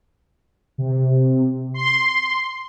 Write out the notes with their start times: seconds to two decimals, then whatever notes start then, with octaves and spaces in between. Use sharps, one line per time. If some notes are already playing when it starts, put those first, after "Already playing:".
0.78 C3
1.74 C6